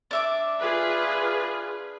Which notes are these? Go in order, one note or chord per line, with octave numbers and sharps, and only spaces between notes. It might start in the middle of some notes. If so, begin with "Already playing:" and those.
D4 E5 D6
F4 G#4 B4